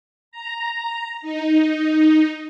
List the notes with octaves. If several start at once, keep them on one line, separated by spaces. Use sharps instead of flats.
A#5
D#4